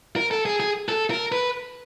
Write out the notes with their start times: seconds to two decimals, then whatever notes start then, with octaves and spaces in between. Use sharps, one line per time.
0.16 A#4
0.31 A4
0.45 G#4
0.60 G#4
0.89 A4
1.10 A#4
1.32 B4